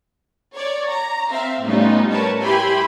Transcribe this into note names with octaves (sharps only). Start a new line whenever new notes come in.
C#5 D5
A#5
C4 E5 F5
A2 G3 B3 C#4 D#4 F4
A#4 B4 C#5 A5
E4 G4 G5 G#5 B5 C6